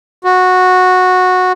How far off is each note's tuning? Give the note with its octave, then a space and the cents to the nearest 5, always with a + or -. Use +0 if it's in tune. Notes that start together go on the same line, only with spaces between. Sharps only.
F#4 -10